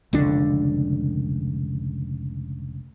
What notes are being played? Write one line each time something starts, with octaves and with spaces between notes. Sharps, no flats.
F1 C#2 D3 D4